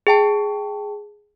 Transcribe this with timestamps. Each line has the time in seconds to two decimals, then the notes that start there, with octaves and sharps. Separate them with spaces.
0.07 G#4 G5 A5